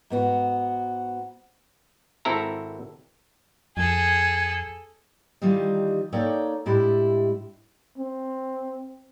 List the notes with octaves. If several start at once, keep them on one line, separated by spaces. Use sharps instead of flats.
G#2 B3 F#4
G#1 C4 E4 A4 A#5
F2 G#4 A4 G#6
D#3 E3 G3 D#4 F4
A#3 D#4 A4 C#5 D5 G5
A2 G#3 D4 E4 G4
C4